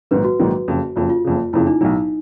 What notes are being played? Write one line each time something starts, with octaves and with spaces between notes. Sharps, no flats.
A#1 G#2 D#3 F#3 B4
F#4
A#1 G#2 D#3 F#3
F#1 F2 C#3
F#1 F2 C#3 F4
F4
F#1 F2 C#3
F#1 F2 C#3 E4
D#4
B1 A2 F#3 D#4